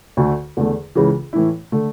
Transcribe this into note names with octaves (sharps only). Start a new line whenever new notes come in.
D2 D3 A3
E2 D3 A3
C#2 C#3 E3
A2 E3 A3 E4
D3 A3